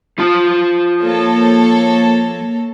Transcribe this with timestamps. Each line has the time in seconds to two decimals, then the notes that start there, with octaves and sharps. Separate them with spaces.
0.18 F3 F4 A5
1.03 A#3 A4 C#5